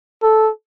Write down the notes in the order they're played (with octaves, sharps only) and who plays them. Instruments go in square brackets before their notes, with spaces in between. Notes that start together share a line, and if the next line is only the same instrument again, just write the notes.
[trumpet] A4